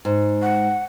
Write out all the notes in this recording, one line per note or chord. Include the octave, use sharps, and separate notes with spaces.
G#2
F#5